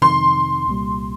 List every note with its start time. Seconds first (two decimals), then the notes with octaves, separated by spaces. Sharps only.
0.01 F2 C3 D#3 C6
0.67 C2 A#2 G3